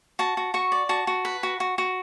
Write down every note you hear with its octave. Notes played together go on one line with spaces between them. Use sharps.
F#4 A5
F#4
F#4 C#6
D5
F#4 A5
F#4
B4
F#4
F#4
F#4